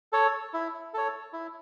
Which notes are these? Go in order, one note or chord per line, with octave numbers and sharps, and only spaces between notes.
A4 C#5
E4
A4 C#5
E4